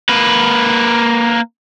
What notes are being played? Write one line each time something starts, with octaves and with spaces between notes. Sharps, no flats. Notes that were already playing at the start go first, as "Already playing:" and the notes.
A#3 B4